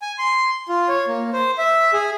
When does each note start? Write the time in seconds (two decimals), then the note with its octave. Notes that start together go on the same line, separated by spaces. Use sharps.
0.02 G#5
0.18 C6
0.69 F4
0.88 C#5
1.07 A#3
1.33 C5
1.58 E5
1.93 G#4